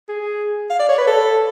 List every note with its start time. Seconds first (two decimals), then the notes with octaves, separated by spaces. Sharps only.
0.09 G#4
0.70 F5
0.79 D5
0.89 C#5
0.98 B4
1.07 A4